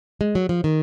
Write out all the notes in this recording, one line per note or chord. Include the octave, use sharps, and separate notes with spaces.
G#3
F#3
F3
D#3